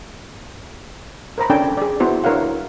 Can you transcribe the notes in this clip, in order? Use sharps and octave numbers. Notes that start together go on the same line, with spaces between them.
A#4 C5 A#5 B5
C#4 D4 A4 G5 G#5
G#4 D5
B3 E4 F#4 C5
D4 E4 A#4 C#5 F5 F#5